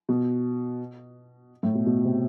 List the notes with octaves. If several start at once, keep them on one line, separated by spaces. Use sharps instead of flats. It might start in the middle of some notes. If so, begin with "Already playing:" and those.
B2
A2
B2
B2
C3